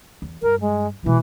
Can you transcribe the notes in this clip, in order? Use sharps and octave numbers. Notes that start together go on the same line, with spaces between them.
E2
G2 A#4
G#3
B2 E3 G#3